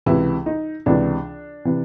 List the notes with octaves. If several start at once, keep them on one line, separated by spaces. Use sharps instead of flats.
C#2 C3 E3 E4
D#4
C#2 C3 E3 D4
C3 E3